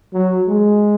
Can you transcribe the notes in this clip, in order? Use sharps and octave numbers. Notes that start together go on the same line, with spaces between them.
F#3
G#3